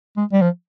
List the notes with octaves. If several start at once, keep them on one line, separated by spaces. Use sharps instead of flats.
G#3
G3
F3